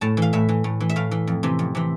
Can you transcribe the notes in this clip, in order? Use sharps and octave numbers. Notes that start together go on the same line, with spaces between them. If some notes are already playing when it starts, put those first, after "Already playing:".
A2 A5
E3 F5
A2 E5
E3
A2
E3
E5
A2 F5
E3
F2
C3 E3
F2
C3 E3